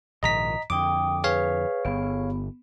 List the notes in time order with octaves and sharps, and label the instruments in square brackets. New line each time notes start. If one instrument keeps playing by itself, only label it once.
[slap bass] A#1 G#2 D#3 [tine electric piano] D#5 A#5 B6
[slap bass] F2 D3 [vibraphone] G5 D#6 [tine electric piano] D6
[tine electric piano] G#4 C#5 F5 [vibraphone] B4
[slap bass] G1 G2 [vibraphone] B3